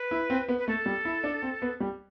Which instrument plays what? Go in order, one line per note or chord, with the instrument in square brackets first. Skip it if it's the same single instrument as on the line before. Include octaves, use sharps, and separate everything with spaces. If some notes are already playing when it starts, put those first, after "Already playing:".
Already playing: [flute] B4
[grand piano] E4
C4
B3
[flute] B4
[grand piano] A3 [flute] A4
[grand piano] G3
E4
D4
C4
B3
G3